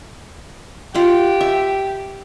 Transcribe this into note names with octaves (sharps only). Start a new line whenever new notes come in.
F4 G4 F#5 G5
E5